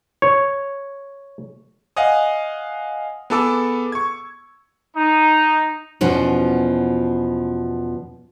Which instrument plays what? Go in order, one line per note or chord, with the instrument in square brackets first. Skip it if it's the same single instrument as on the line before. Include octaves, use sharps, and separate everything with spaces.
[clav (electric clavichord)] C#5
[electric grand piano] D#5 F5 F#5 G#5 D#6
B3 G#4 A4 A5 D6 E6
C#6 G#6
[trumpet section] D#4
[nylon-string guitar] E2 B2 F3 C#4 F#4